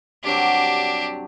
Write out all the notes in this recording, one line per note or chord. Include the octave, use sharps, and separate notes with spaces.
G2 C3 F#3 D4 G4